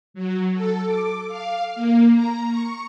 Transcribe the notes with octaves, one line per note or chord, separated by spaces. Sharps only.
F#3
A4
D6
F5
A#3
A#5
C#6